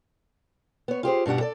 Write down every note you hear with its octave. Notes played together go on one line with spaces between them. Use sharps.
B3 C#5
F4 G4 G#4 C5
G2 B2 D4 G4 F#5
A4 D5